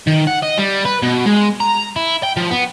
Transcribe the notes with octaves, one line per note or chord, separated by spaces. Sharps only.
D#3
F#5
D#5
G3
B4
B2
G#3
A#5
E4
G5
F3
B3